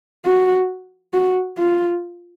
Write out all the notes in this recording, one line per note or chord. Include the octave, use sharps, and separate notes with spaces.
F#4
F#4
F4